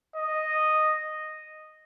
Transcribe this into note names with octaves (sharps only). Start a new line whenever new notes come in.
D#5